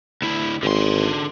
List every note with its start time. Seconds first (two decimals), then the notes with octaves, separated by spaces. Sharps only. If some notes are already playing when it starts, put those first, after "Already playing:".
0.22 D2 E4
0.63 G#1 D3 C6